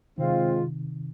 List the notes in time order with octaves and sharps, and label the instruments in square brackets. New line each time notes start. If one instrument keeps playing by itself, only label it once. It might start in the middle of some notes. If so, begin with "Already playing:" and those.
[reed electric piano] C3 D#3 [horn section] G#3 C4 F4